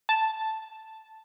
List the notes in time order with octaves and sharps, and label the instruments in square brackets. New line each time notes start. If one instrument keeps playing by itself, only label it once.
[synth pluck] A5